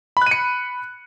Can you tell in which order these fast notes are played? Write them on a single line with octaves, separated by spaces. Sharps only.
B5 F#6 D#7 C#7